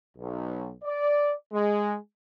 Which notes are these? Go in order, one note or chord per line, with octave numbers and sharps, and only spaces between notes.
B1
D5
G#3